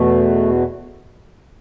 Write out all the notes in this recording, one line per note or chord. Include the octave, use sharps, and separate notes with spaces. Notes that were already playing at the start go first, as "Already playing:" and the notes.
Already playing: E2 B2 A3